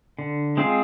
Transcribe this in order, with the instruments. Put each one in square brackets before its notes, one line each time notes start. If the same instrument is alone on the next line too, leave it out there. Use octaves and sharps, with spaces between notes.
[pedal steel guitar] D3
G#3 C4 F4 G#4